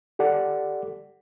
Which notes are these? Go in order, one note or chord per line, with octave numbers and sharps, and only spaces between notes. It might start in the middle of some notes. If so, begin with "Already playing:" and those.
G4 A4 D5 F#5